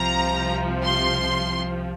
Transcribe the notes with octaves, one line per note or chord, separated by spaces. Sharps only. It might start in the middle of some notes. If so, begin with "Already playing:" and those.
Already playing: C2 C3 F3 A#5
C6